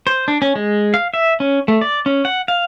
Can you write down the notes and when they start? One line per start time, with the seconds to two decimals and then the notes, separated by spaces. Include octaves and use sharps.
0.07 C5
0.28 D4
0.42 C#4
0.56 G#3
0.94 F5
1.14 E5
1.40 C#4
1.68 A3
1.81 D5
2.06 C#4
2.25 F#5
2.48 F5